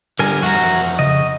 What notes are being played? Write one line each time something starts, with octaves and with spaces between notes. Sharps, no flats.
D3 G3 A#4 G#5
F2 F#4 E5 F#5 A#5
C#3 D#5